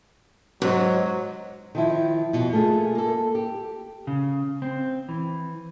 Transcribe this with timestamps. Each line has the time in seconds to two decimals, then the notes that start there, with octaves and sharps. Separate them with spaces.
0.62 G#2 F#3
1.75 D#3 F3 E4
2.33 F2 B2
2.53 A3 A#3 F4 G#4
2.95 A#3 A4
3.35 G4
4.07 C#3
4.62 C4
5.09 E3